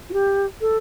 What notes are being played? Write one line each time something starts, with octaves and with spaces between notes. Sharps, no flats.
F4
G4
A4